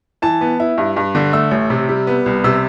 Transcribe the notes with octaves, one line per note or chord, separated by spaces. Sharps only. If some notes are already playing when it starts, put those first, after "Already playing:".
E3 A5
B3
E4
G2
G2
D3
A3 E6
A1
C3
G3
B3
C2
C3 E6